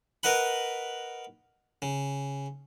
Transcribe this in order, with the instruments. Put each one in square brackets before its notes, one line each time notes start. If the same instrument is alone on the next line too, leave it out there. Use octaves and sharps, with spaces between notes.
[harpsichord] A#4 B4 D#5 F#5 B5
C#3